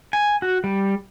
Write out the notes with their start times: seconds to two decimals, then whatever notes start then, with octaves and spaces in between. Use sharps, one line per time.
0.13 G#5
0.42 F#4
0.64 G3